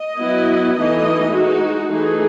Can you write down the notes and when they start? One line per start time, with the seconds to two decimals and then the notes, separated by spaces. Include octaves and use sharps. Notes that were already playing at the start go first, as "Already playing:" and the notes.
Already playing: D#5
0.19 F#3 B3 E4
0.76 E3 A3 D#4 D#5
1.33 G#3 D#4 F#4
1.91 E3 A3 D#4 G#4